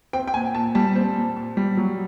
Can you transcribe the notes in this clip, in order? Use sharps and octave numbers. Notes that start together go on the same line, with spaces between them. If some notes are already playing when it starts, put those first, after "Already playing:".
C4 G5
G5
A#2 G#5
A#2 A5
G3 A5
C4
A#2
A#2
G3
F#3